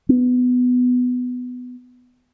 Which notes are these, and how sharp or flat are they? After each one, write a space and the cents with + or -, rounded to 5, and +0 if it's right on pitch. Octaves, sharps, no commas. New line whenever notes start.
B3 +10